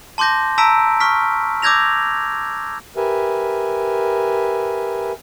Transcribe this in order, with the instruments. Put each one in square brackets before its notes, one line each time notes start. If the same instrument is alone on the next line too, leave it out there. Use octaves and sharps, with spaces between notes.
[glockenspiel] A5 C6 D6 G6 A#6
A5 A#5 E6 B6 D7
C#6 F6 B6
D6 E6 G6 G#6 A#6 F7
[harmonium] G4 A#4 B4 E5 G#5